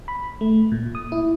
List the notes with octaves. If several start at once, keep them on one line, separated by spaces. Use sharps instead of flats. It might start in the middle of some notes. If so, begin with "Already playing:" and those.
B5
A3
A#2
D#6
E4